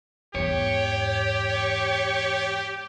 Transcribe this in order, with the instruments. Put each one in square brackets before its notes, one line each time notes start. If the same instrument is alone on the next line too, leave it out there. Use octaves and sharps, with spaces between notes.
[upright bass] E2 G#2 [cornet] G4 [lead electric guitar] C#5